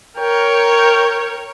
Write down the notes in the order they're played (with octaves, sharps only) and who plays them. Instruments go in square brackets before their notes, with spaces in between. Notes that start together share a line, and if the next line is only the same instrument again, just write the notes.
[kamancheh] A#4 C#5 [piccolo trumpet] G5